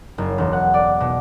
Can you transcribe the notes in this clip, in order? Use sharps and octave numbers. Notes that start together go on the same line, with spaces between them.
F#1
E1
F#5
D5
B2